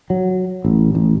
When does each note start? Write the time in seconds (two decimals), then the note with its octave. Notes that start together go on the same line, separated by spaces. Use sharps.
0.10 F#3
0.65 A1
0.95 A1